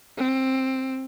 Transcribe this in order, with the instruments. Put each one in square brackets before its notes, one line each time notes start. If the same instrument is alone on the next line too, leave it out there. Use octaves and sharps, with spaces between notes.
[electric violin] C4